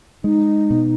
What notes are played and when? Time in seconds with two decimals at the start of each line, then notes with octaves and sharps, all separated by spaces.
0.24 G#3 D#4
0.70 B2